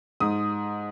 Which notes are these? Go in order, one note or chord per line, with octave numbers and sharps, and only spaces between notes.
G#2 D#6